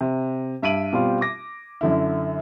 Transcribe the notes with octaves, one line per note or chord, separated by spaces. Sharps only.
C3
G2 E5 D7 D#7 F#7
B2 G3 C4 F4
D6 A#6
F#2 D3 E4